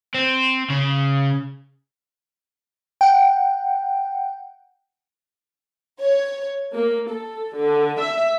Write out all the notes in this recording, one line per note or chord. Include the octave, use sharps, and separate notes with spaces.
C4
C#3
F#5 G5
C#5
A#3
A4
D3
E5